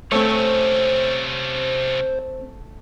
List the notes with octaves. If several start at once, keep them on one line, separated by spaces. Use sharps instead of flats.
C3 A3 C4 C#4 C5 C#5